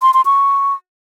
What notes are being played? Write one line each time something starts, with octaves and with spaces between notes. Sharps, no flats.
C6
C6
C#6